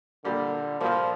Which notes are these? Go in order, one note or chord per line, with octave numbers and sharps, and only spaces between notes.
A#2 D3 G3 A#3
A#2 F3 G3 A#3